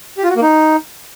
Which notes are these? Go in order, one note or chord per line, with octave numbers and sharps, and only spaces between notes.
G4
F4
F#4
A#3
D#4